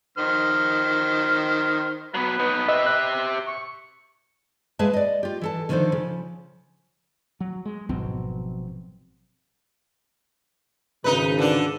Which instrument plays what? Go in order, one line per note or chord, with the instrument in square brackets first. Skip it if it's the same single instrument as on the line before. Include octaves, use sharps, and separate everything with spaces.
[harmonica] D#3 C5 F6
[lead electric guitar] F#3 B3 [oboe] B4
[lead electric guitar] B3 D#4
[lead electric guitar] G4 E5 [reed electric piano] D#5
[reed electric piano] F#6
[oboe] C#6
[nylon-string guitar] G#3 G#4 B4 E5 F5 A5
D5 D#5
F4 G4
E3 A4 A5
D3 D#3 F3 D4 A4 C5
C#3 F3
[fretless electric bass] F#3
G#3
[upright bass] G#1 F3 [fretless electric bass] B2 F#3 C4
[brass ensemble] G#1 C#3 [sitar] D#4 B4
[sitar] D3 D4